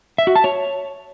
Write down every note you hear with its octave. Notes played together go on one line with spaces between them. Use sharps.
E5
F#4
A5
C#5